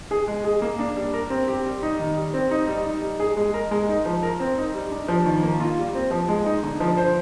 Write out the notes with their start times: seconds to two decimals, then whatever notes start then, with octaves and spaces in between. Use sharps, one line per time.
0.11 G#4
0.28 G#3
0.44 G#4
0.62 A#3
0.79 D4
0.96 G3
1.13 A#4
1.30 C4
1.48 G4
1.65 G3
1.82 D#4
1.99 D#3
2.17 G3
2.34 C4
2.51 D#4
2.67 G3
2.86 D#4
3.02 G3
3.20 G#4
3.37 G#3
3.54 A#4
3.71 G#3
3.89 D#4
4.06 F3
4.23 A#4
4.40 C4
4.57 D#4
4.74 G3
4.91 D4
5.08 F3
5.25 D#3
5.43 A#3
5.60 F4
5.77 G3
5.95 C4
6.11 F3
6.28 G#3
6.46 D#4
6.63 D3
6.80 F3
6.97 C5